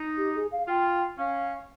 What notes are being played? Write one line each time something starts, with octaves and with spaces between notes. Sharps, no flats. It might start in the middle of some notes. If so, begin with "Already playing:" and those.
Already playing: D#4
G4
G#4
F5
F4 G5
C#4 F5